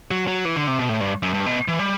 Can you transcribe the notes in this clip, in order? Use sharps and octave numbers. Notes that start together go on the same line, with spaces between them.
F#3
F#3
E3
D3
C3
B2
A2
G2
F#2
G2
B2
E3
G3